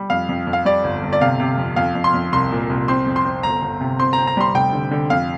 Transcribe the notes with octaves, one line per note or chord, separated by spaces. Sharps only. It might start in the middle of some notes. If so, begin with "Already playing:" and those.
Already playing: G3
F2 F5
F2
F2
F5
G3 D5
G1
G1
D5
C3 F5
C3
F2
F2 F5
F2
C6
F2
C2 C6
A#2
C2
C4 C6
F2
C6
C4
G1 A#5
G1
C3
C4 C6
A#5
C4
A#5
G3 C6
F1 G5
D3
D3
F2 F5